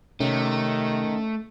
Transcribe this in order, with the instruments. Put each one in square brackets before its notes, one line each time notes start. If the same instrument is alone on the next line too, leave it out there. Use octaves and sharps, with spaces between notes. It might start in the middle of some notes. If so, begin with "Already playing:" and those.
[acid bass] C3 [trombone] D#3 [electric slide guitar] A3 [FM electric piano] C#4